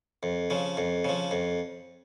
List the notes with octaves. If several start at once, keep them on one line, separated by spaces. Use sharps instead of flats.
F2
C#3 F3
F2
C#3 F3
F2